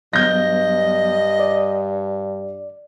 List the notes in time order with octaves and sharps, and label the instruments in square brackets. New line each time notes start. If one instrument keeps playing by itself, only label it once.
[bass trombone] G2 [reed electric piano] F#3 B3 [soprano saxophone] D#5 [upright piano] G6 A#6
[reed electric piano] D5